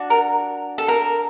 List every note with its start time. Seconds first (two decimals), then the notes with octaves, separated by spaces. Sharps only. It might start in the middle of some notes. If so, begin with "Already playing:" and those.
Already playing: D4 F#4
0.10 A#4
0.78 A4
0.88 A#4